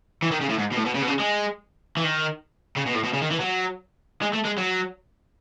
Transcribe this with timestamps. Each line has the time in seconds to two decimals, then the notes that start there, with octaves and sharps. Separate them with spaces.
0.22 E3
0.31 D#3
0.41 C#3
0.50 A2
0.59 G#2
0.72 B2
0.77 A2
0.86 B2
0.95 C#3
1.02 B2
1.08 C#3
1.20 G#3
1.97 E3
2.04 D#3
2.76 C#3
2.86 B2
2.94 A2
3.04 B2
3.13 C#3
3.22 D#3
3.31 E3
3.40 F#3
4.22 G#3
4.34 A3
4.45 G#3
4.58 F#3